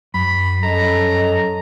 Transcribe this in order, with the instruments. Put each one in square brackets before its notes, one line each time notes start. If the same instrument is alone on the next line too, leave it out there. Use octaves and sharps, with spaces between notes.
[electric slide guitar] F#2 [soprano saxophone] B5
[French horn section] C#4 A4 D#5 [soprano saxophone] A#5